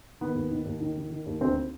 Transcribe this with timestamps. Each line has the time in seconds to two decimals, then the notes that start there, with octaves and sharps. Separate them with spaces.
0.21 D#3 B3
0.35 D#2
0.51 D#3
0.65 D#2
0.81 D#3
0.96 D#3
1.10 D#3
1.26 D#2
1.41 D2 C4